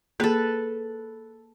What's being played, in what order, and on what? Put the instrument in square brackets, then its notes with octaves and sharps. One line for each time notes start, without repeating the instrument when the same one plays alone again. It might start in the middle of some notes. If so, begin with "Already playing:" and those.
[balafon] A#3 G#4 [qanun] A4 B4